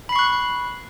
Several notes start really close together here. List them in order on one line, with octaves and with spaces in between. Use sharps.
B5 C7 C#6 F#6